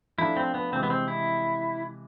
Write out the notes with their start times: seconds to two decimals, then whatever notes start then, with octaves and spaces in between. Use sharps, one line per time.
0.18 F3 A3 D4 E4
0.37 C4
0.54 B3
0.72 C3 E3 G#3 C4
0.83 B3
0.90 C4
1.08 E4